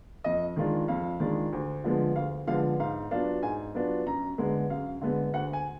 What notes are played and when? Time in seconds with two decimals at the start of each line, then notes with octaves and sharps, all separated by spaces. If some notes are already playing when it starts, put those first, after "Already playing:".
0.24 F2 D#5
0.56 D#3 G#3 D4 F4
0.88 F2 F5
1.20 D#3 G#3 D4 F4
1.52 D2
1.84 D3 F3 G#3 B3
2.15 D2 F5
2.47 D3 F3 G#3 B3 F5
2.79 G#2 F5
3.11 F#3 B3 D4 F4 F5
3.43 G#2 G#5
3.74 F#3 B3 D4 F4
4.06 F#2 A#5
4.38 D3 G#3 B3
4.70 F#2 F5
5.01 D3 G#3 B3
5.34 D2 F#5
5.53 G#5